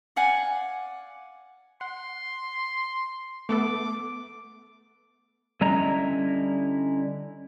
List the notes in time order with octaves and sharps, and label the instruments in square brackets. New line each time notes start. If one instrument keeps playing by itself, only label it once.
[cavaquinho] D5 F5 F#5 G#5
[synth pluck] F#5 [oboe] C6
[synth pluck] A3 B3 A4 [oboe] D6
[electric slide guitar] D3 G3 C#4 E4 D#5 A#5